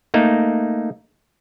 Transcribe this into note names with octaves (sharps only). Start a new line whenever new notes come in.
A3 A#3 D#4